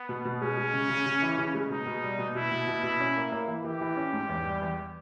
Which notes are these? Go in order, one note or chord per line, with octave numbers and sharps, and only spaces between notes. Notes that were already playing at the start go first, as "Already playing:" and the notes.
Already playing: B3
B2
B2
G#3 C#4
G#3
C#3
C#3
C#3
E3
C#3
G#3
B2 D#4
B2
G3
B2
B2 E4
B2
B2
B2
C#4
A#3
A#3
E3
E3 G4
E3
C#4
G#2
E2
G3
E2